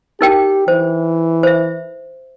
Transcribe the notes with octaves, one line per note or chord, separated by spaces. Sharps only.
D#4 G4 A#4 G5
E3 C5
C5 E5